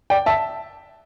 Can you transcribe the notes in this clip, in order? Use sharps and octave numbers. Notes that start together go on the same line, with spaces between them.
D5 G5
E5 A5